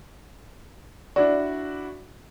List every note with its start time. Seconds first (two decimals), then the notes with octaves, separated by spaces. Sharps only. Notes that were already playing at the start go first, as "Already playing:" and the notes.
1.16 D4 E4 F#4 D5